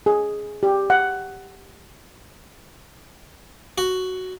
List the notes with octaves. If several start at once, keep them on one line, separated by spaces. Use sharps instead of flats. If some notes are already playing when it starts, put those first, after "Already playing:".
G#4
G4
F#5
F#4